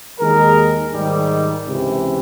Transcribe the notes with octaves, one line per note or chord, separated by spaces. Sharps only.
D#2 D#3 G#3 G#4 A#4
G#2 D#3 G3
C#2 C3 E3